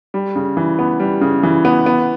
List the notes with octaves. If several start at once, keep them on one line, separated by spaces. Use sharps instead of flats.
G3
C#3
E3
B3
G3
C#3
E3
B3
B3